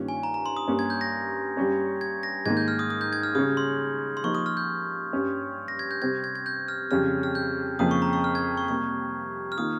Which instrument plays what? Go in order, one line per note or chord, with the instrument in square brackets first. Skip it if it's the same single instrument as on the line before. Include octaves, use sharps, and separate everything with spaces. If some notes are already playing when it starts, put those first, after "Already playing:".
Already playing: [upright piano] G2 D#3 A#3 C#4 F4
[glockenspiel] G#5
A#5
A#5
C6
D#6
[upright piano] G2 G3 A#3 C#4 G4
[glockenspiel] G#6
G6
A#6
[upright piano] G2 G3 C#4
[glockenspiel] G#6
A#6
[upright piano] G#2 D#3 A#3 [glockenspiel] G#6
[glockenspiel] G6
F6
D#6
D#6
G6
G#6
F6
[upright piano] C#3 G3 C#4 [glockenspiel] D#6
[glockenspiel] C6
C6
[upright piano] F3 A#3 D#4 G4 [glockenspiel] C#6
[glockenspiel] D#6
F6
G6
[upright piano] G2 G3 C#4 G4
[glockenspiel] A#6
G#6
G6
[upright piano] C3 G3 C4 [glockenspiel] G#6
[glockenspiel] G#6
G#6
G6
F6
[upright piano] F2 C#3 G3 C#4 G4 [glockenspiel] F6
[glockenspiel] F6
G6
[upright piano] F2 C#3 F3 A#3 [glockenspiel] D#6
[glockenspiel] C#6
A#5
C#6
F6
G#6
C#6
[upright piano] C3 G3 A#3 [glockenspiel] C#6
[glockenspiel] F6
[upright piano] D#3 A#3 F4 [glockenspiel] D#6